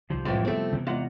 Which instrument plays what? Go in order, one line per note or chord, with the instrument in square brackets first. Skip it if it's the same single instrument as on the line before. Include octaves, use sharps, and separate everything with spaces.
[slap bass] C2 D#3 [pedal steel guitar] F3 G3 C5
[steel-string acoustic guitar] F2 A2 E3 [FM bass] G#3
[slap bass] F1 B3 [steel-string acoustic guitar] A3 C4
[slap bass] C3 E3 B3
[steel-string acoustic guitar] E2 [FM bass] G#3 [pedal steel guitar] F4 F#5 A#5